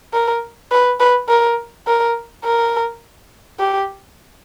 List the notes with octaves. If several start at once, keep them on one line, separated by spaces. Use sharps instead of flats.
A#4
B4
B4
A#4
A#4
A#4
G4